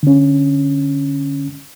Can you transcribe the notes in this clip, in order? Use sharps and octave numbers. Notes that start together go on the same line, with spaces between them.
D3 C#4